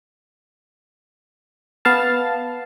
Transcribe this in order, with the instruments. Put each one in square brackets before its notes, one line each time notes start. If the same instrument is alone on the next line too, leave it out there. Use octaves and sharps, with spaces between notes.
[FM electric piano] B3 F5 A5